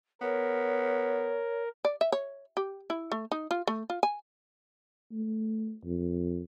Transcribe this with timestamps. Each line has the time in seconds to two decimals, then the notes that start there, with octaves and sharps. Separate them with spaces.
0.21 B3 A#4 C#5
1.85 D5
2.01 E5
2.12 C#5
2.57 G4
2.90 E4
3.12 A3
3.32 D#4
3.51 F4
3.67 A3
3.90 F4
4.03 G#5
5.12 A3
5.84 F2